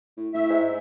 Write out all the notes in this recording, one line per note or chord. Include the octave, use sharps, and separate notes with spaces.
A2
A2 E5
G#2